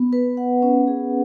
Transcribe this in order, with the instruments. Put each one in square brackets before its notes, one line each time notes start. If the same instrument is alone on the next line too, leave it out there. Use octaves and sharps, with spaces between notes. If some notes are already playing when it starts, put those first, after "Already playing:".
Already playing: [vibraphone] B3
B4
F#5
C#4
G#4